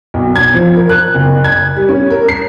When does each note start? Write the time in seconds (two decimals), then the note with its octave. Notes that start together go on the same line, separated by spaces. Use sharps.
0.14 B1
0.36 G#6
0.54 F3
0.76 A#4
0.89 F#6
1.14 F#1
1.44 G#6
1.76 G3
1.89 C#4
2.10 A#4
2.28 C7